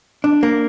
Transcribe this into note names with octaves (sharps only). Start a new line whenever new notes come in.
D4
A#3